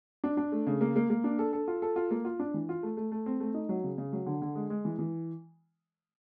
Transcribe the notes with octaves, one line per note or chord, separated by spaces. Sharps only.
D4
D4
A3
C#3
A#3
A#3
A#3
D4
A4
A4
F4
A4
F4
A#3
F4
D4
E3
F4
A3
A3
A3
C4
A3
D#4
F#3
C#3
C#3
F#3
D3
D3
G#3
G#3
E3
E3